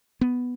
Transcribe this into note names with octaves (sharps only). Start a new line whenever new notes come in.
B3